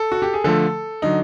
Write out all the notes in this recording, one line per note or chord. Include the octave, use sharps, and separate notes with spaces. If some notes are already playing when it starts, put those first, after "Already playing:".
Already playing: A4
F#4
G4
G#4
D3 F3 A3 A4
D3 F#3 D#4